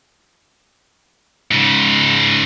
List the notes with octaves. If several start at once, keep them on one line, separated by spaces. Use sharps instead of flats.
G#2 C#3